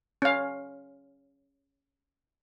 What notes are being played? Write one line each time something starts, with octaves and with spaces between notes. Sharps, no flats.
C#4 F5